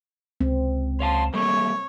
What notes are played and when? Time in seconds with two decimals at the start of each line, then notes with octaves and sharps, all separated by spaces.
0.41 C#2 C4
1.00 C#5 F5 A5 C6
1.34 G3 A3 A#3 C#5